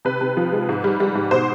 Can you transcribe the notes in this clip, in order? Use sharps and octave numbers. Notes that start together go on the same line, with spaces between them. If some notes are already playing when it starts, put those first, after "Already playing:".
C3 B4
C3
F3
G#3
G#2
G3
G3
G#2
B2 C5